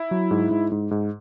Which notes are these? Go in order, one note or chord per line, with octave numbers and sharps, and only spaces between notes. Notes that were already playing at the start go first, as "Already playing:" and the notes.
Already playing: E4
F#3
G#2
G#2
G#2
G#2